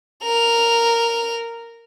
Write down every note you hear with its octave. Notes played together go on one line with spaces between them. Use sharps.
A#4 F7